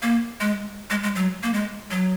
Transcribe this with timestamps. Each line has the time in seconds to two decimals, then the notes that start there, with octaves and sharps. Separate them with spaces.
0.02 A#3
0.41 G#3
0.90 G#3
1.03 G#3
1.15 F#3
1.43 A#3
1.53 G#3
1.91 F#3